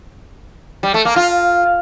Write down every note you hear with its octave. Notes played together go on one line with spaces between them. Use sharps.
G3
A3
A#3
F4